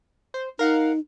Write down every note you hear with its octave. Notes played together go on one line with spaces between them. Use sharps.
C5
D#4 A#4 F5 F#5